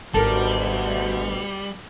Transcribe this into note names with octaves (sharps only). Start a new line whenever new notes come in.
G#1 D2 B2 G3 F4 A4 A#4